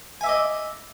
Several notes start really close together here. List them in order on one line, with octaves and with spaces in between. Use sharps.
G#5 E5 D6 D#5